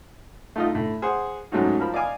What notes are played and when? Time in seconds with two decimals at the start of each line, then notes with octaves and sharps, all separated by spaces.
0.56 A3 D#4 F4 A4 D#5
0.71 A2 D3
1.02 G#4 C5 F#5
1.52 G#2 F#3 A3 C#4 D#4 F#4
1.80 F3 A#4 B5
1.94 D5 D#5 F5 G#5 D6